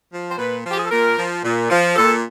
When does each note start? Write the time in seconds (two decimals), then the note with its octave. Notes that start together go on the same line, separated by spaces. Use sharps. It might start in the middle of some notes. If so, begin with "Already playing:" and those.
0.12 F3
0.31 C5
0.38 A#2 B4
0.65 F3
0.70 G4
0.77 G#4
0.84 A4
0.91 A#2 A#4
1.17 F3
1.44 A#2
1.70 F3
1.96 A#2 A4